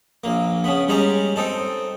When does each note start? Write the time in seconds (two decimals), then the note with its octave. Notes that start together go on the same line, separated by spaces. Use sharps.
0.24 A#1 A#3
0.64 C#3 B3
0.88 G3 G#3 C#4 A#5
1.36 C4 D#4 A4